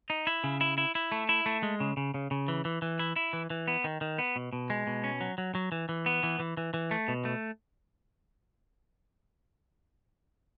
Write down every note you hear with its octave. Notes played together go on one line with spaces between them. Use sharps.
D#4
E4
C#3
E4
E4
E4
A3
E4
A3
G#3
C#3
C#3
C#3
C#3
E3
E3
E3
E4
E4
E3
E3
B3
D#3
D#3
B3
B2
B2
G#3
B2
C#4
F#3
F#3
F#3
E3
E3
B3
E3
E3
E3
E3
A3
B2
A3